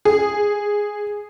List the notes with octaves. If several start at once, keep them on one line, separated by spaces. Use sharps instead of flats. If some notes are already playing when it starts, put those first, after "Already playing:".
G#4